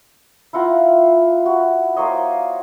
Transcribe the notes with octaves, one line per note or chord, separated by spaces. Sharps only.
E4 F4 F#5 A#5
F#4
A#3 C5 C#5 D#5